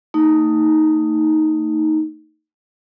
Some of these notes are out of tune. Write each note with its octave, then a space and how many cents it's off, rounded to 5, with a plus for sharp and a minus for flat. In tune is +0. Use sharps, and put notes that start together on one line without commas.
A3 +45 D#4 +5